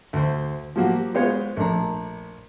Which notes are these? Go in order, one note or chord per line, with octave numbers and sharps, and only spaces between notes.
D2 C5
F3 F#3 A#3 F#4 G4
G#3 B3 F4 C5 C#5
A#1 A3 D4 A#5